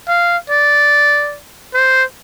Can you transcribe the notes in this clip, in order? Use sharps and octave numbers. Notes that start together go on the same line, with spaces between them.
F5
D5
C5